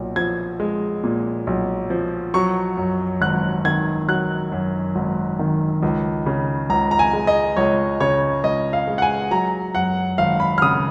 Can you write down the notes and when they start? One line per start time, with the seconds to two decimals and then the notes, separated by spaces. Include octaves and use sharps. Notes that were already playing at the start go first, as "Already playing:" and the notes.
Already playing: B1 A#2
0.16 F3 G#6
0.60 G#3
1.04 A#2
1.47 B1
1.90 F3
2.34 F#3 C#6
2.77 F#2
3.21 G#1 F#6
3.65 D#3 G#6
4.09 F#3 F#6
4.52 F#2
4.95 G#1
5.39 D#3
5.83 C#2
6.26 C#3
6.70 C#2 A#5
6.91 A#5
6.99 G#5
7.13 G#3
7.27 D#5
7.57 C#2 C#5
8.00 C#3 C#5
8.44 C#2 D#5
8.73 F5
8.87 G#3
8.98 F#5
9.02 G#5
9.31 F#3 A#5
9.75 F#2 F#5
10.18 G#1 F5
10.40 B5
10.58 F6
10.62 C#3 D#6